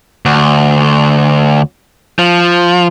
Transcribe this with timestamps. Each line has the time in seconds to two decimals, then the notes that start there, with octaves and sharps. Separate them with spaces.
0.26 D2
2.19 F3